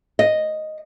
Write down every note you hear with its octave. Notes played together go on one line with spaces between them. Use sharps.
D#5